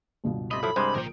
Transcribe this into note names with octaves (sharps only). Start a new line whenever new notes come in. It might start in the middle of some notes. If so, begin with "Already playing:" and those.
C#2 G2 B2
C3 A3 D#5 B5
F3 F#3 E4 A4 D#6
C2 G2 G#3 C5 C6 D6
A#1 A#4 G5